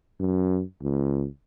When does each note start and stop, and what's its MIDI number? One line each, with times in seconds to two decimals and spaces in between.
0.20 0.62 42
0.82 1.26 37